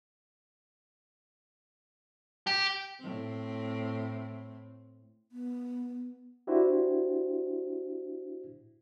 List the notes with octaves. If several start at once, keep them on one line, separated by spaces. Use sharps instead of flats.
G4
A2 C4
B3
D4 E4 F#4 G4 C5